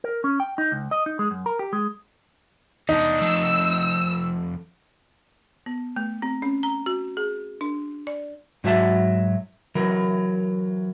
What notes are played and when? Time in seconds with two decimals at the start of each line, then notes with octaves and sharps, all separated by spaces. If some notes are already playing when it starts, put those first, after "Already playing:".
0.04 A#4
0.24 C#4
0.40 G5
0.58 D#4
0.72 C#2
0.91 D#5
1.06 D#4
1.19 G#3
1.31 F#2
1.46 A#4
1.59 G4
1.73 G#3
2.89 E2 D4 D#4
3.21 F2 A3 E6
5.66 B3
5.96 A3
6.22 C4
6.42 C#4
6.63 A#5
6.86 F#4
7.17 G#4
7.61 D4
8.07 D5
8.64 G#2 F#3 F#4 E5 A5
9.75 E3 F#3 A#4